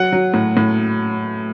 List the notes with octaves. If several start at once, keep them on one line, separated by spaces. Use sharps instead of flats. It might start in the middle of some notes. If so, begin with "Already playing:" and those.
Already playing: F#3 F#5
F#3
A2
A2